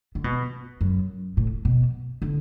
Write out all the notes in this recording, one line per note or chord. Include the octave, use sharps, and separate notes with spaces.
D3
B2
F#2
A2
B2
D3